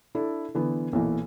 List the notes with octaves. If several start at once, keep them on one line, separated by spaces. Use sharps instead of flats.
D4 E4 A4
D3 E3 B3
B1 A#2 E3